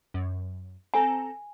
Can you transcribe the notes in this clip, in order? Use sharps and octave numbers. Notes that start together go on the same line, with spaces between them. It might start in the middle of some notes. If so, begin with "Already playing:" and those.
F#2
C4 A4 G#5 A#5